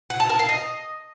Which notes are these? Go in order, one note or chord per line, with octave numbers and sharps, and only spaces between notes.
F#5
A5
A#4
F5
D#5